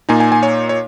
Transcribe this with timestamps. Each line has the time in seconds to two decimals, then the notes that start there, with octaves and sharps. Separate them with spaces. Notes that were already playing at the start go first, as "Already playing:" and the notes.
0.09 A#2 A#3 D#4 G#5
0.20 G#5
0.32 G#5
0.43 C#5
0.69 C#5